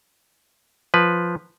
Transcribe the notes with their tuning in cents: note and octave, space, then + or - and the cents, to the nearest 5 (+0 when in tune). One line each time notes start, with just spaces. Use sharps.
F3 +0 B4 +0